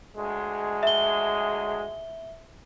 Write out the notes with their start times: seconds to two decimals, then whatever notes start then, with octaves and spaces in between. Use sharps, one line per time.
0.16 D2 G#3
0.83 E5 G7